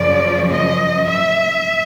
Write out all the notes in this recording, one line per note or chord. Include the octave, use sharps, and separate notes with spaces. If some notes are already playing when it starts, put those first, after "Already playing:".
Already playing: F#2 C#3 F3 D5
D#5
E5